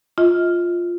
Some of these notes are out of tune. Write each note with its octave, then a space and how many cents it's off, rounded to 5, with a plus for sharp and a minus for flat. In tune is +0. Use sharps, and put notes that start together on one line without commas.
F4 +0 D#5 +35